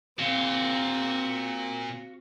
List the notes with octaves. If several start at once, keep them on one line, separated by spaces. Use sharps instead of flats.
A#2 C4 F#4 F5